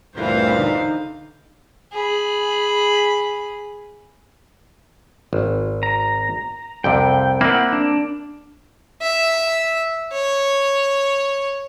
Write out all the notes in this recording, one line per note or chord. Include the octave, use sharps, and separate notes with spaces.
D2 G2 A#2 E3 A3 C4 C5 F5
D3 D#4
G#4 B5
G#1
A#5
C2 F2 C3 G5
A#3 C4 E4 F#5
D4
E5
C#5